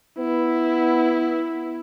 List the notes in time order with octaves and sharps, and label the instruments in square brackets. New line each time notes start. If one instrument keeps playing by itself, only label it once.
[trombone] B3 [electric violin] E4